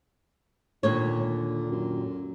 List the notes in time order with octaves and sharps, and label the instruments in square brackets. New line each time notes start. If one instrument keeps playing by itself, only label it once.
[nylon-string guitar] D#2 A#2 C#5 [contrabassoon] D3
[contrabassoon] F#2